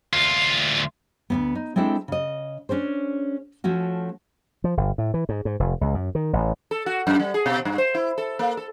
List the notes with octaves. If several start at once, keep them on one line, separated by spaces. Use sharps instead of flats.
D2 F4
D2 G#2 B3
D#4
G#3 C4 D4 E4 A4 C5
C#3 D#5
C#4 D4 G#4 C5
F3 A3 C#4 F#4
F3
G1
A2
E3
G#2
G#2
F1
C#2
F#2
D#3
A1
A4
F#4
F#2
G3
G#4
B2
G2
C5
E4
A4
A#3
A4